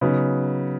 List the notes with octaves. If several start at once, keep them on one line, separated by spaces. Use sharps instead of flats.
C#3 F#3 B3 D#4